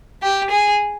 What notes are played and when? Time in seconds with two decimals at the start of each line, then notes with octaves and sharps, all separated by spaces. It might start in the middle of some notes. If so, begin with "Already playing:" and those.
0.22 G4
0.50 G#4